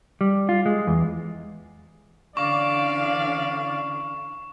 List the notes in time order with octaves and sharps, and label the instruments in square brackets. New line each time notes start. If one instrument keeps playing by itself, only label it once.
[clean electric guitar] G3
F4
G#3
E2
[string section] D3 E3 C#4 [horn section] D5 [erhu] F5 [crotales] C#6